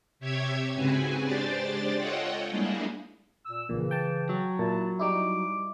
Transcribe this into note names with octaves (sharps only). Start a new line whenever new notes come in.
C3 G4 C#5 E5 G#6
G#2 C#3 C4 F#4 B4 G#5
G#3 D4 G4 C5 D5 A6
F4 A4 C#5 D#5 F#5 G5
G3 G#3 A#3 D4 E4 G#4
A#2 E6
A#1 A#2 C#3 E3
G5 A5
F#3
A#2 E4 A5
G3 D#4 E4 D6